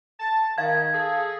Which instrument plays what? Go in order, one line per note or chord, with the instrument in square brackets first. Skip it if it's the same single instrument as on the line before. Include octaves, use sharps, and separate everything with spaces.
[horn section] A5
[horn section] D#3 [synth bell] F5 G#6
[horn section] G#4 A4